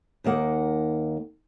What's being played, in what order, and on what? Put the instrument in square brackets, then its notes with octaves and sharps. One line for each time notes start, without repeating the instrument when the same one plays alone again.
[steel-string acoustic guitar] D#2 D#3 A#3 F#5